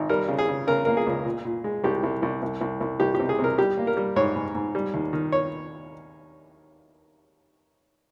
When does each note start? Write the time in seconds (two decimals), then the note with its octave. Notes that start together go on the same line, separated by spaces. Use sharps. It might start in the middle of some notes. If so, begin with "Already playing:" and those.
Already playing: G#1
0.09 G3 A#4
0.28 C#3
0.39 G#4
0.48 C#3
0.67 C#3 A#4
0.85 A#3 A#4
0.97 G#4
1.06 C#2
1.25 A#2
1.45 A#2
1.64 G#3
1.84 C2 G4
2.03 C2
2.22 C2
2.42 C2
2.61 C2
2.80 C2
3.00 C2 G4
3.15 C3 G4
3.29 G#4
3.39 C3
3.44 A#4
3.58 G3 G4
3.78 A#3
3.87 A#4
3.97 G3
4.16 G#2 C#5
4.36 G#2
4.55 G#2
4.75 G3
4.94 D#2
5.13 D#3
5.32 C#5